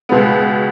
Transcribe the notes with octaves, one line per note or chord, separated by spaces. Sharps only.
C#2 B2 B3